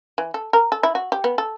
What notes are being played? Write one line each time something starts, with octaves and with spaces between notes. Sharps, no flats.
E3
A4
A#4
A4
E4
F#4
G4
B3
A4